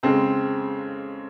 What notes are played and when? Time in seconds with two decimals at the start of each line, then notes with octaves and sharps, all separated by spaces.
0.03 F2 C#3 G#3 C4